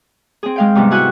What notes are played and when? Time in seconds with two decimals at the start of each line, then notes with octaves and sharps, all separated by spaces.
0.43 C4 G#4
0.56 G#3 F5 G5
0.75 G#2 C3 G3 B3
0.91 E4 F#4 F#5 G#5